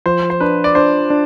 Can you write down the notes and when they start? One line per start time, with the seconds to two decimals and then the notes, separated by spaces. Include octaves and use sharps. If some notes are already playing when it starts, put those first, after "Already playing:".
0.06 F3 C5
0.30 C5
0.40 D4 B4
0.64 D5
0.75 D4 C5
1.10 D4